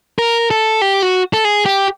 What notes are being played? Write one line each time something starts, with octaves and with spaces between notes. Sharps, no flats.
A#4
A4
G4
F#4
A4
G#4
G4